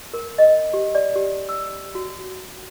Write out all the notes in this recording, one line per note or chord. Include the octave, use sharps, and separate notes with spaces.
A#4
D#5
G4
D5
G4
E6
F#4